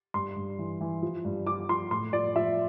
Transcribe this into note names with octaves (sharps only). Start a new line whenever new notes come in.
G2 C6
G2
E3
E3
F3
G2
F3 D6
F3 C6
A2 C6
F3 D5
F3 E5